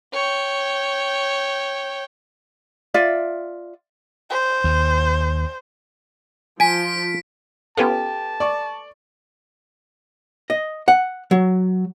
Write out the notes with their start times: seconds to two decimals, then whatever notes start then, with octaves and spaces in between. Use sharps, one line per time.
0.13 C#5 G5
2.94 F4 D5 E5
4.30 C5
4.64 D#2
6.60 F3 G#5 B6 D7
7.77 B3 C#4 F4 G4 A4 B4 G#5 A5
8.40 D5 C#6
10.50 D#5
10.88 F#5
11.31 F#3